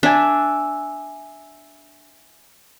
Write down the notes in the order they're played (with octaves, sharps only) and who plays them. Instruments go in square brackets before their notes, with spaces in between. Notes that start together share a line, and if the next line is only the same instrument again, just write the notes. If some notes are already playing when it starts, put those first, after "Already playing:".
[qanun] D4 [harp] E5 G#5